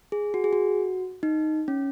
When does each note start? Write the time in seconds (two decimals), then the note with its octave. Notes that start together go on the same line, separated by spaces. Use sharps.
0.12 G#4
0.34 F#4
0.44 G#4
0.53 F#4
1.23 D#4
1.68 C#4